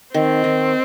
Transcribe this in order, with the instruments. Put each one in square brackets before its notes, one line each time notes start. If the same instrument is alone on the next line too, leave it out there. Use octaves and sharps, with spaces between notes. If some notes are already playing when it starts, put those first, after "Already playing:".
[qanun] D#3 [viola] C4
[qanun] D#3